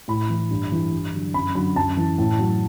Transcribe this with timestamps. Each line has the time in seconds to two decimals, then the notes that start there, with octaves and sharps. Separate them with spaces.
0.08 A2 B5
0.30 E3
0.50 G2
0.72 E3
0.92 G2
1.14 D3 F#3
1.34 F#2 B5
1.55 D3 F#3 B5
1.76 F#2 A5
1.97 E3
2.18 A2
2.39 F#3